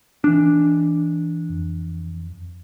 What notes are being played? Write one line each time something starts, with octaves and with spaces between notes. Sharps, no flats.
E3 D4
F2